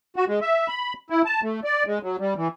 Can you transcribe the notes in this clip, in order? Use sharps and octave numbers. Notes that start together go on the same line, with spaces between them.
F#4
G#3
E5
B5
E4
A5
A3
D5
G#3
F#3
G3
E3